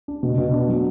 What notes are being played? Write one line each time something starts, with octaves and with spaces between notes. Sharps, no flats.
D4
B2
B2
D4
F#3